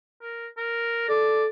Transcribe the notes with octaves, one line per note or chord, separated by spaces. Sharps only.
A#4
A#4
A4 D5